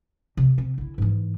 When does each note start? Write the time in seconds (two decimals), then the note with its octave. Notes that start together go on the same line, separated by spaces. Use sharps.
0.37 C3
0.58 C4
0.78 D3 E4
0.98 G#2 E3